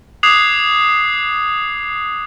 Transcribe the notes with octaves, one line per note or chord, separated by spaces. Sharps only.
D6 D#6 F#6 G#6 C7 F7